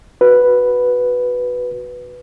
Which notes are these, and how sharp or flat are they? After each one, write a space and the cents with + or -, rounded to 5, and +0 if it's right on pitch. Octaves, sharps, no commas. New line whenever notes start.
F#4 +0 B4 +0